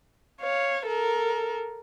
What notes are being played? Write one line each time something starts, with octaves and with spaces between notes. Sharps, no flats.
C#5 F5
A4 A#4